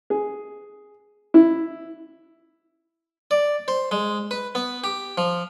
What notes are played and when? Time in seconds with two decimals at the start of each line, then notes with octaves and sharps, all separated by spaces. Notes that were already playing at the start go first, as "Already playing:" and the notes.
0.10 G#4
1.34 E4
3.31 D5
3.68 C5
3.91 G#3
4.31 B4
4.55 B3
4.84 G4
5.18 F3